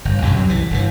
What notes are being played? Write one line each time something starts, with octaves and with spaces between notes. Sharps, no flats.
G1
B1 F#2 C3 F#3
C2 E3
G1 A#2 E3